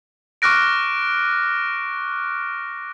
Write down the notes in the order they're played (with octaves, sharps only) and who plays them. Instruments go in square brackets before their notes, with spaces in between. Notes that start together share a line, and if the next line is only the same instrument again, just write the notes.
[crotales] C#6 D6 F6 F#6 A#6 D7